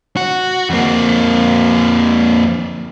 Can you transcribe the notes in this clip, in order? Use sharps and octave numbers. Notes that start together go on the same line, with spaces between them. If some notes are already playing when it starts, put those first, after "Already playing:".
F#4
F2 A#3